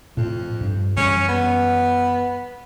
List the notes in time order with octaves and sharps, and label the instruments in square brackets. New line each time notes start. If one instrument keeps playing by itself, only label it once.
[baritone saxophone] F2 [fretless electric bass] A2
[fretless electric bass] G2
[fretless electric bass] F#2 E3 G3 [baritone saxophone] C#4
[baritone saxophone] B3